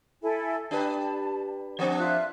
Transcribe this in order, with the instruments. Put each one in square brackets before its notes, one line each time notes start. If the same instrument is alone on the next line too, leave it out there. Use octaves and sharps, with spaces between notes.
[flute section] E4 A4 G#5
[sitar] D4 G4 B4 [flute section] A5
[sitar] F3 C4 D4 [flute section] F#5
[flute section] F4 E5 F#6